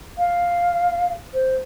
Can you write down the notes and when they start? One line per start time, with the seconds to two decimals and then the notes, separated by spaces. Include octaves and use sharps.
0.18 F5
1.34 C5